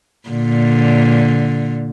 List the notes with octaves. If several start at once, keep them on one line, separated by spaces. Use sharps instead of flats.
A#2 D3